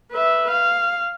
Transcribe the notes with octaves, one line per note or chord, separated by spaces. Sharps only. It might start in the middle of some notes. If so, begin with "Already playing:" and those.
B4 E5
F5